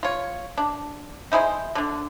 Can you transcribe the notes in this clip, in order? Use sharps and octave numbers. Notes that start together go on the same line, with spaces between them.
F4 C#5
D4
D#4 E4 G#4 C5
D3 D4